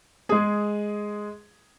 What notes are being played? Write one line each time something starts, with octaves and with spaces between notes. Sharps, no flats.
G#3 G#4